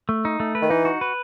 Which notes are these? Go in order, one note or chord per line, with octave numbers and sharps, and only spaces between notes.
A3
D#4
A3
B4
D#3
E3 D#4
F#4
B4